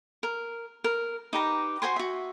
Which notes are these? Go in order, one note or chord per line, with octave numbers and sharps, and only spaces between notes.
A#4
A#4
D#4 G4 B4 A#5
F#4 C5 G#5 C6
F#4 E5